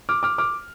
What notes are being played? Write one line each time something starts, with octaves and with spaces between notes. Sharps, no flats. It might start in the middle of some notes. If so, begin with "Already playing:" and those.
D6 F6
D6 F6
D6 F6